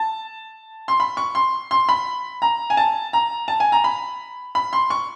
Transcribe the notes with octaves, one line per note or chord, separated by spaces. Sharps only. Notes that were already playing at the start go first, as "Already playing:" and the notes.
Already playing: A5
C6
B5
C#6
C6
C6
B5
A#5
G#5
A5
A#5
A5
G#5
A#5
B5
B5
C6
C#6